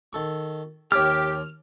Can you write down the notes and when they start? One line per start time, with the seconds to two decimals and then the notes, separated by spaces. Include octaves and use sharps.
0.13 D#3 A4 C#6
0.92 D#2 G4 C#5 D6 F6